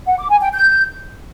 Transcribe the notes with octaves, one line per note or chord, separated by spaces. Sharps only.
F#5
D6
G#5
G5
G6